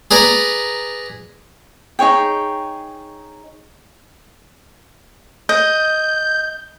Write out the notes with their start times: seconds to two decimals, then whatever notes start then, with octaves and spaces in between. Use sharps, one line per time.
0.11 G#4 B4 D5 A#5
1.99 D#4 G#4 C#5 G5
5.49 D#5 G6